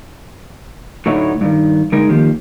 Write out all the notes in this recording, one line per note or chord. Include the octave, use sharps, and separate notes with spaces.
A2 D3 F#3 D#4 E4 C#5
G2 D#3
D3 G#3 D#4 A#4
D#3 F3 A#3 G4